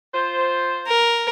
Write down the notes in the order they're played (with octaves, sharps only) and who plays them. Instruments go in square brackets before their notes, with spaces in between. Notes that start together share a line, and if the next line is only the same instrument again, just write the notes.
[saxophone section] F4 C5
[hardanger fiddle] A#4